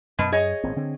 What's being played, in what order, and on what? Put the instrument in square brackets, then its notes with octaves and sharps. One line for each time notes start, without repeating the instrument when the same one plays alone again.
[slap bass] F#2 [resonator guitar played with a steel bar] B2
[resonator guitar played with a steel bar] G#4 C#5 D#5
[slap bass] G#1 A#2 C4
D3 C4